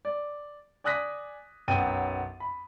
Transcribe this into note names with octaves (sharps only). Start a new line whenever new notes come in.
D5
D5 G#5 D#6 F#6 A#6 B6
B1 F#2 B3 G5 A6 D#7
B5